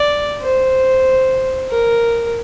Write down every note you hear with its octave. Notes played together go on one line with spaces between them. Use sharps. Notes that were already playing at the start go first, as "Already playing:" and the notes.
Already playing: D5
C5
A#4